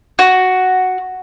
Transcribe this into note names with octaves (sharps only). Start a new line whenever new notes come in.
F#4